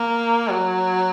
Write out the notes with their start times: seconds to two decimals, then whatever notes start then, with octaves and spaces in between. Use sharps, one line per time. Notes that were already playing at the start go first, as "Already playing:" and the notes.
Already playing: A#3
0.49 F#3